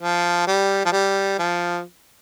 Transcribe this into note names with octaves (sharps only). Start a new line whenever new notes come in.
F3
G3
F3
G3
F3